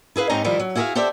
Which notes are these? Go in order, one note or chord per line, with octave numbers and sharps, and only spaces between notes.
E4 G#4 B4 F5
G#2 C4 C#4 D#4 G4 A#5
D#3 F3 G3 E4
F#3
E4 F#4 G#4 A4 E5 F5
G4 A4 C5 D5 E5